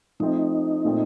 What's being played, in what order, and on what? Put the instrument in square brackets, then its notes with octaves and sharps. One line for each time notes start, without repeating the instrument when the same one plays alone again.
[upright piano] F3 A3 C4 [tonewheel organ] D#4
[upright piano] A#2 A3 C4